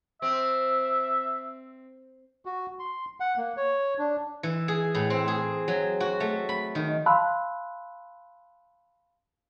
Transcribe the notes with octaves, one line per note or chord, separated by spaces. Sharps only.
C4 E5
F#4
C6
F#5
A#3
C#5
D4
E3
G#4
A2
C4
G#4
F#3
F#4
A3
B5
D#3
F5 A5 B5 C6 E6 F#6